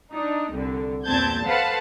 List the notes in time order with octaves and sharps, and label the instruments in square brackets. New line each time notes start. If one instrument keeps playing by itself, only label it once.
[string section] D4 D#4
C2 D3
E2 A#2 C4 A5 G6 G#6
A4 B4 C5 F5 F#5 A5